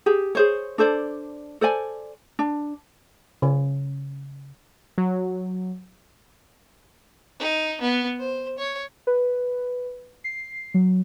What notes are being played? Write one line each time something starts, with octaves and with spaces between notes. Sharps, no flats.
G4 G#4
G#4 C5 C#5
D4 A4 C5 D5
A4 C5 D5 G#5
D4
C#3
F#3
D#4
B3
C5
C#5
B4
C7
F#3